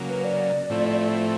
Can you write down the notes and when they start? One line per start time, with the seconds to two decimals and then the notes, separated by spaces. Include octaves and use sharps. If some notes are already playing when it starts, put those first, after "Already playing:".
Already playing: C#3 F#3 A#3
0.08 B4
0.24 D5
0.70 A2 F3 A3 C4 E4